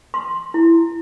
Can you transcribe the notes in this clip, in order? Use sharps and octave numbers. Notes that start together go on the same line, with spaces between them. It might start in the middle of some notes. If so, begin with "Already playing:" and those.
C6
E4